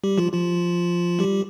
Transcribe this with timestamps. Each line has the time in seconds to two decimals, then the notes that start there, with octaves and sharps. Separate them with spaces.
0.04 G3 G4
0.18 F3 F4
0.32 F3 F4
1.19 G3 G4